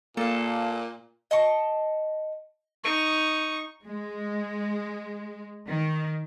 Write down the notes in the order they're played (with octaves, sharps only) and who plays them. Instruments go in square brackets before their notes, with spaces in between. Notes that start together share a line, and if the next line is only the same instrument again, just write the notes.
[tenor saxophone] A#2 [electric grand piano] A#3 [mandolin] A4 F5
[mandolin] D#5 A5 C#6
[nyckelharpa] D#4 C#6
[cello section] G#3
D#3